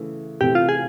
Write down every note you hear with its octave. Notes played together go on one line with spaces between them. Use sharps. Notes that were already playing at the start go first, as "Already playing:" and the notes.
Already playing: C#3 E3 A3
C3 E3 A3 C4 G4
F4
G#4